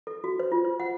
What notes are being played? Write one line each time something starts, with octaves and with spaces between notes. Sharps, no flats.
A4
F#4
C5
F4
C5
F#5